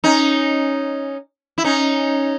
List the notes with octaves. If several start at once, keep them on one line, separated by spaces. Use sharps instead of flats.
C#4 D#4
E4
C#4 D#4